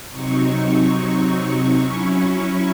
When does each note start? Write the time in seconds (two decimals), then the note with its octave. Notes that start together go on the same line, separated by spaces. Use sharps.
0.11 C3 F#3 C4 D#4 C#6
0.53 C#6
0.94 C#6
1.78 F#3 C#4 E4